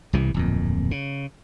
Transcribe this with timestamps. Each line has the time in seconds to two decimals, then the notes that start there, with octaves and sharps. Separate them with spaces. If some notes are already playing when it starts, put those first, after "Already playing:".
0.13 C2 C3 E3
0.34 D1 F2 A#2
0.91 C#3